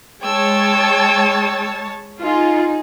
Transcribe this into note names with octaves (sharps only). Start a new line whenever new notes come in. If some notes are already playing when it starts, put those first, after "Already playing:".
G#3 C#5 G5 A5 E6
D#4 F4 G#4